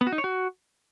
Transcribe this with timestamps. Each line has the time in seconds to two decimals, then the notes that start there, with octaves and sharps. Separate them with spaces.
0.01 B3
0.07 F#4
0.12 D#4
0.18 C#5
0.24 F#4